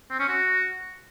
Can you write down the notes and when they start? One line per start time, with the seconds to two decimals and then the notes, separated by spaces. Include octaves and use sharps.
0.10 C4
0.19 C#4
0.28 F#4